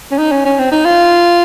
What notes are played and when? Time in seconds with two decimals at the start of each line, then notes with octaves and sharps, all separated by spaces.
0.11 C#4
0.18 D#4
0.32 C#4
0.45 C#4
0.59 C4
0.72 D#4
0.85 F4